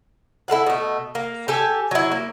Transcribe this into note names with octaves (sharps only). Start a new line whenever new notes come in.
E4 A4 F5 F#5
B2 A3
A#3
G4 A4 G#5
F#3 E4
A#3